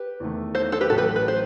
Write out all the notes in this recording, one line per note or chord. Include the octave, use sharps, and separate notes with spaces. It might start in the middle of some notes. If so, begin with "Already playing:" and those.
Already playing: G4 B4
E2 D#3 A3
A4 C5
A4 C5
G4 B4
A1 A2 F#3 F#4 A4
G4 B4
B4
C5